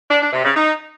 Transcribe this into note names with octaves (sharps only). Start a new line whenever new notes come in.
D4
D4
C3
C#3
D#4